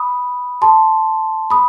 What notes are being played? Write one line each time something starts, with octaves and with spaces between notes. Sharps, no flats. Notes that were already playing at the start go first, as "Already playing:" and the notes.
Already playing: B5 D#6
A5 C6
B5 D#6